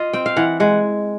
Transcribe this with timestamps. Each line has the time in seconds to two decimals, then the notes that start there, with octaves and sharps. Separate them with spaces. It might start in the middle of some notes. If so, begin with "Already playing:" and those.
Already playing: F4 D#5
0.13 C4 G5
0.26 F5
0.36 E3 F#5
0.60 G#3 F#5